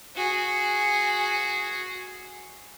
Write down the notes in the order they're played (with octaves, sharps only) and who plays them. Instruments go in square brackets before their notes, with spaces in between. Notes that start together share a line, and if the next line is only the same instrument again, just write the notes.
[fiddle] F#4 G#4